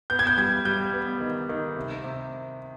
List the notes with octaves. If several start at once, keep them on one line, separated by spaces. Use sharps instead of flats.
B3 G6
G#6
G6
G3 G#6
G3 G6
B3
D#3
D#3
C3
C3